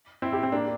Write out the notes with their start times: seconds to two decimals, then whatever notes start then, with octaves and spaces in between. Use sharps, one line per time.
0.22 C4 E4
0.32 E4 G4
0.43 C4
0.52 A#3 D4